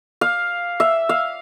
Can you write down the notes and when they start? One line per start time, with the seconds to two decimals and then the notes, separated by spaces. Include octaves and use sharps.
0.21 F5
0.80 E5
1.09 F5